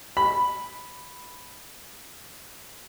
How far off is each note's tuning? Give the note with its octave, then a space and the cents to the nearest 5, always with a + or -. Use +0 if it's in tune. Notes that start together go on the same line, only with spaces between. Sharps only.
B5 +0